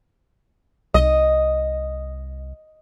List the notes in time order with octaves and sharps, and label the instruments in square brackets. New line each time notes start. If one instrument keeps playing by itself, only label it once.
[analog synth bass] C2 [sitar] D#5